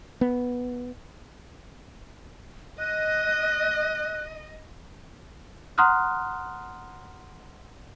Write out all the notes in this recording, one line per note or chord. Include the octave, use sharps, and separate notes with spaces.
B3
D#5 F#6
F#5 A#5 C6 D#6 F6 F#6